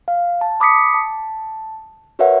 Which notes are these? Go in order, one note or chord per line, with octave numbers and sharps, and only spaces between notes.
F5
A5
B5 D6 D#6 B6 C#7
A5
F#4 A#4 B4 C#5 E5 F#5